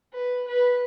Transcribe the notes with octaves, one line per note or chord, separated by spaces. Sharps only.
B4
B4